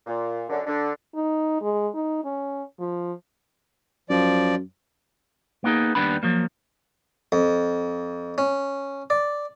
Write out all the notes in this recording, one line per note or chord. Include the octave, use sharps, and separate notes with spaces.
A#2
F#2 D3
D3
D#4
G#3
D#4
C#4
F3
F#2 F3 D5
A#3 B3 D#4 G#4
D#2 G3 B3 D4 B5
F3 F#3 A#3
F2
C#4
D5